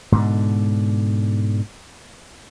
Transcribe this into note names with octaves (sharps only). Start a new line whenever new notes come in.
G#2 B2 D3